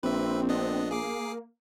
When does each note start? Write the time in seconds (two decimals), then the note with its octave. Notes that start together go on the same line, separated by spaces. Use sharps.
0.03 A#1 C4 B4 E5
0.49 B3 D4 D#5
0.91 A#3 G#4 D6 C7